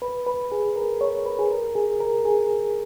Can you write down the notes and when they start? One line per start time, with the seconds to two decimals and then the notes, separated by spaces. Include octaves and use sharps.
0.02 B4
0.27 B4
0.52 G#4
0.76 A#4
1.01 C#5
1.26 B4
1.39 G#4
1.51 A#4
1.75 G#4
2.00 A#4
2.25 G#4